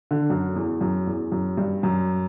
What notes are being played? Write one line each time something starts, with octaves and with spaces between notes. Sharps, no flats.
D3
F#2
E2
F#2
E2
F#2
G2
F#2